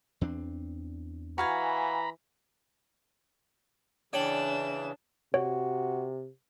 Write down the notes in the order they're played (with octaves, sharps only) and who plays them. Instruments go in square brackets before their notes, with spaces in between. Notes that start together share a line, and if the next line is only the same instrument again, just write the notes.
[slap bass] E2 C4 D4
[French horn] E3 [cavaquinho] F#4 F5 G#5 [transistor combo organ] A#5 B5
[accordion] C#3 E3 [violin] D4 E7 [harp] C#5 [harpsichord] D5 G5
[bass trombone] C3 [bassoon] F#4 [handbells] C#5